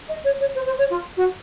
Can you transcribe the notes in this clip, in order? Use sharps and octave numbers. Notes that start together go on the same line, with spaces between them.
D#5
C#5
C#5
C5
C5
C#5
F4
F#4